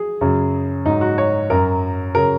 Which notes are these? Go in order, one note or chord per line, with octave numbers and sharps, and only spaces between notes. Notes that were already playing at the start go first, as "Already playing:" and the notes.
Already playing: G#4
F#2 C#3 F#3
G#2 F#3 D#4
F#4
C#5
F#2 F#3 A#4
C#3 F#3 A#4